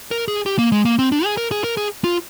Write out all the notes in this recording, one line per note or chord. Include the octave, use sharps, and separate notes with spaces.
A#4
G#4
G4
A#3
G#3
A#3
C4
D4
G#4
A#4
G#4
A#4
G#4
F4